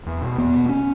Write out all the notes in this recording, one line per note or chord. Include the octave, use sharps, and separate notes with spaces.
E2
B2
E2 B3
B2
C#4